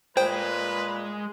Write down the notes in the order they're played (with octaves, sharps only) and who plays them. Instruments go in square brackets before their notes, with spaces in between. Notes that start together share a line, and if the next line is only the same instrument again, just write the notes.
[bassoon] A#2 [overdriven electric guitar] G#3 G#4 [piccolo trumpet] B4 [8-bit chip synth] C5 G5